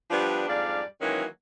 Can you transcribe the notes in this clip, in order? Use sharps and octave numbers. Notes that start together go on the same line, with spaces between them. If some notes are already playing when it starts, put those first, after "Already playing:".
F3 G3 B3 D4
F2 G#2 G3 D4 D5 F5
D#3 E3 F#3 G#3 A#3 C#4